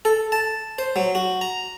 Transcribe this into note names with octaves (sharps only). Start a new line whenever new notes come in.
A4
A5
C5
F#3
F#4
A#5